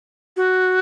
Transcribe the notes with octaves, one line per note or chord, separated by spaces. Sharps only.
F#4